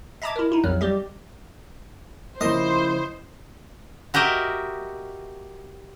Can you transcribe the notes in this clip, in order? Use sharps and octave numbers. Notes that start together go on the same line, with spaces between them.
D#5 E5 A5 A#5 D6 G#6
E4 A#4
D#4 E4
A#1 F2 F#3 F6
G3 G4 D#5
C#3 F3 A#3 E4 C5 D#5
F#4 G4 A#4 D#5 E5